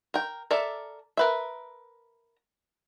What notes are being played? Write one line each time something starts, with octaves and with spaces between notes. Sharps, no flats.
A#4 G5
A4 A#4 D5 E5
A#4 B4 E5